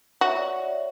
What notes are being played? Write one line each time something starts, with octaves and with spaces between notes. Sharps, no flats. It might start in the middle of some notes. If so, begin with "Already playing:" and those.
F#4 C#5 E5
D5